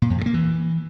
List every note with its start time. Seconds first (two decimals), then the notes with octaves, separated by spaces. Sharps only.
0.02 A#2
0.10 F2
0.18 G2
0.26 A#3
0.34 E3